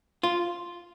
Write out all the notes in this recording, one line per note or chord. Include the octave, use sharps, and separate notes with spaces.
F4